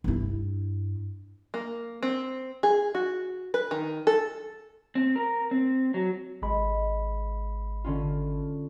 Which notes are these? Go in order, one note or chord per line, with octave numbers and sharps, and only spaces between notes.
G2 E4
A#3
C4
G#4
F#4
B4
D#3
A4
C4
A#4
C4
F#3
G#1 G#3 B5
D3 C#4 F4